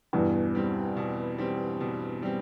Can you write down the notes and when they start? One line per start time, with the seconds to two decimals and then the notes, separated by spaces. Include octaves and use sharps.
0.13 E2 G2 B2
0.55 G3 C4
0.97 B2
1.38 G3 C4
1.80 B2
2.23 G3 C4